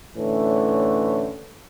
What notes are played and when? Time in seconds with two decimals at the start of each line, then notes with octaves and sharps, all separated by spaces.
0.17 A2 D3 E3 A3 C#4